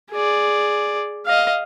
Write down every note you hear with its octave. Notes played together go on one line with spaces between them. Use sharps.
G#4 D5
D#5 F5